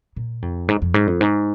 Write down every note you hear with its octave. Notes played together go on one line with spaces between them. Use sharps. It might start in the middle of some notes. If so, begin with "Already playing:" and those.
A#2
F2
G#2
F2
G#2
F2
G#2